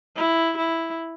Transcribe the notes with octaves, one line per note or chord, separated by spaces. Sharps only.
E4
E4